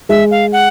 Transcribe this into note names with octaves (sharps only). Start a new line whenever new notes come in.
G#3 E5
F5
F#5